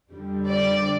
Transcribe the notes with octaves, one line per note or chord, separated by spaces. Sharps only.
F2 D3 G3
D5